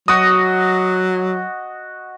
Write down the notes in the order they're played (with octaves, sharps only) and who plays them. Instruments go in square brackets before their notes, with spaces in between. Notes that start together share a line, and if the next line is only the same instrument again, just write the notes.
[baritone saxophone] F#3 [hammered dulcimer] F#4 D#5 [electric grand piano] D#6